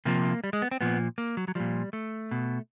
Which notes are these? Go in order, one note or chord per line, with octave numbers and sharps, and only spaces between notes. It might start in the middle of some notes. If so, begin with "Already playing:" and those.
C3 F3 A#3
G3
G#3
B3
C4
A#2 F3 B3
A#3
F#3
F#3
A#2 F3 G3
A3
B2